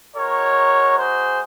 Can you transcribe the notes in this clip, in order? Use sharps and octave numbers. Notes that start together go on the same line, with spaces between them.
G#3 D#4 F#4 A#4 C#5
G#4 C5